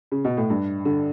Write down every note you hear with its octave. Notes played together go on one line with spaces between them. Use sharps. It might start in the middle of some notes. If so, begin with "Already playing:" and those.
C#3
B2
A2
G2
D3